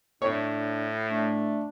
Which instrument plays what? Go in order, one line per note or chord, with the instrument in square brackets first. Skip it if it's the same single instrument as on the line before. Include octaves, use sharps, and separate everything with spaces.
[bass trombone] A2 [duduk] D4 [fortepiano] C#5
[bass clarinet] A3 [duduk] D4